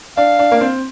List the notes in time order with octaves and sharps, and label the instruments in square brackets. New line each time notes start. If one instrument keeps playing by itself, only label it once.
[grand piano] D4 [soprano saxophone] F5
[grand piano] D4
A#3
C4